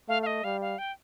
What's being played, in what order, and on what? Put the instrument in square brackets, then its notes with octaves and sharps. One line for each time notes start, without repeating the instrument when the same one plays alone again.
[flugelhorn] A3 [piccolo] F5
[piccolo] F5
D#5
[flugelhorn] G3 [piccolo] F5
[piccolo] F5
G5